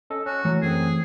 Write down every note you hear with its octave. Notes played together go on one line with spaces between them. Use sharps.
C#4 A4 D#5
C#4 F#4
E3 F#3 A3 C#5
F#2 C4 G#4